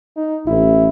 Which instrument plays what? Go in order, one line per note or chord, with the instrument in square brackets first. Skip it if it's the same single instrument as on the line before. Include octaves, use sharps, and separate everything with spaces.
[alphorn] D#4
[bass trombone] A1 [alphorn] E4